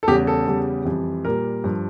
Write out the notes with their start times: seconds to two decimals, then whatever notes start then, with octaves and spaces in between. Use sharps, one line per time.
0.03 A4
0.08 E2 C#3 G3 G4
0.27 A4
0.47 E2 C#3 G3
0.85 F2 E3 G3
1.25 A#2 G3 A#4
1.64 G2 F3